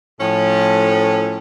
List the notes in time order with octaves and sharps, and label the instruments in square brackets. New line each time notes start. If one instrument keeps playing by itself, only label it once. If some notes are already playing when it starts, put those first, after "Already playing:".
[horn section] A2 F3 C#4